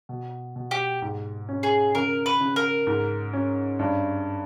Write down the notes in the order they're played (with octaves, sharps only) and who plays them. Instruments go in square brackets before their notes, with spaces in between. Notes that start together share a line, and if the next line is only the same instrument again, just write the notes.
[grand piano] B2
B2
[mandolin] G4
[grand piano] G#2
C#4
[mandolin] G#4
[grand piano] C#3 [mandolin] A#4
[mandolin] B4
[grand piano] C#3
[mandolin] A#4
[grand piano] G#2
C#4
G2